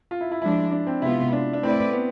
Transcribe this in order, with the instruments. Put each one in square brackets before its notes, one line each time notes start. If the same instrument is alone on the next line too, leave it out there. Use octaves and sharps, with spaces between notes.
[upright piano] F4
E4
E4
[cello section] F3 G#3 D4 [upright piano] E4
[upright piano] D4
C4
[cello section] C3 G#3 B3 F4 [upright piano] E4
[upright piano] D4
D4
[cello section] A3 E4 B4 D5 [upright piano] C4
[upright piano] B3